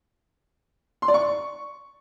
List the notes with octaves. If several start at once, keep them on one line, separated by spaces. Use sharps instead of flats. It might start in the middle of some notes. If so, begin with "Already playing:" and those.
C6
D5
C#6